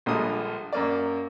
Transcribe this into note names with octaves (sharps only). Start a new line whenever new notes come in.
A#1 D3 G3 G#3 F4 D#6
F#2 A#3 D5